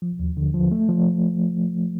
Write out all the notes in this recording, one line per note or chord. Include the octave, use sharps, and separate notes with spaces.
F3
D#2
D3
F3
A3
F3